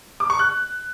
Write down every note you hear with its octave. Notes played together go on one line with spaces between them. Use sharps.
D6
C#6
F#6